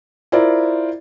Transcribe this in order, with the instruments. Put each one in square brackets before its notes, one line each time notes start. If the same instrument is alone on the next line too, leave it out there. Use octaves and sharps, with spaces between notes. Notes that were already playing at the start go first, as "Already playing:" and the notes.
[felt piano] E4 F4 A#4 C5 D5